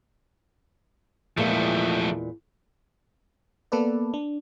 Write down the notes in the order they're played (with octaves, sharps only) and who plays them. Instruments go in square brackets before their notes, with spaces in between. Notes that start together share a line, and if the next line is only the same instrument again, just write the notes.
[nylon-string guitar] E2 A#2 G#3 [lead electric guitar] F3 A3
[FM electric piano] A#3 B3 A4 B4 D5
D4